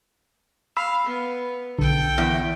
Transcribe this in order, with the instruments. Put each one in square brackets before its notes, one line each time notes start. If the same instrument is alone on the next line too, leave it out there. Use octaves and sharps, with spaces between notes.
[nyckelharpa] F5 [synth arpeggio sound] B5 E6
[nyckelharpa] B3
[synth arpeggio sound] B1 D3 [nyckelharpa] A4 G5
[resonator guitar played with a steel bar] E2